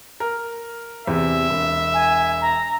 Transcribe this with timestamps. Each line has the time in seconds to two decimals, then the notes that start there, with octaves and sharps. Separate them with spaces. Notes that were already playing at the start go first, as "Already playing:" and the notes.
0.20 A#4
1.07 E2 C3 E5
1.50 E1
1.94 G#5
2.41 A#5